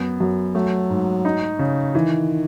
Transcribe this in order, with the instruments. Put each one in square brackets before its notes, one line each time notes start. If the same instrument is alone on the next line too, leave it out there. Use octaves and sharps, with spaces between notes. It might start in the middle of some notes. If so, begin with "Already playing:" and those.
Already playing: [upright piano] F#2 B3
F#2
[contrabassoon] F#3 [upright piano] A3
[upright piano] G#2
D#4
C#3
[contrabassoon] D#3 [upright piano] E3